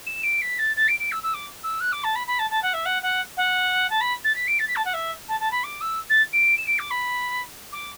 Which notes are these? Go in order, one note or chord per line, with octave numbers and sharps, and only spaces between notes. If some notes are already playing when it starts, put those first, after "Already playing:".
E7
D7
B6
A6
A6
D7
D7
E6
E6
D6
E6
F#6
D6
A5
B5
B5
A5
A5
F#5
E5
F#5
F#5
F#5
A5
B5
A6
B6
D7
A6
B6
A5
F#5
E5
A5
A5
B5
D6
E6
A6
D7
E7
D7
D6
B5
D6